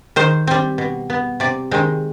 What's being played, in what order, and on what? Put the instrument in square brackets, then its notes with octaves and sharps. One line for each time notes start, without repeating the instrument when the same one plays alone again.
[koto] D#3 C5
G3 C4
B2
B3
C3 D5
D#3 G#3 C4